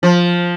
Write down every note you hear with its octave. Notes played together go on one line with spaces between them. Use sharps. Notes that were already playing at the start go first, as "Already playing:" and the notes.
F3